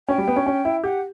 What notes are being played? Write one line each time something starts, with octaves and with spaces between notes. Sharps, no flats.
C#4 G5
G3
B3
C#4
C#4
E4
G4 F#5